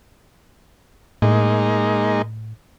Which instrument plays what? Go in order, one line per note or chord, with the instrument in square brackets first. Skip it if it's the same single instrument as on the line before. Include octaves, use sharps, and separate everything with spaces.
[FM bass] A2 [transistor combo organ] G#3 A#3 D#4